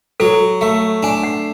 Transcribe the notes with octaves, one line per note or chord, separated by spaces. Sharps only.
F#3 A4
A3
D4 G#5
F#5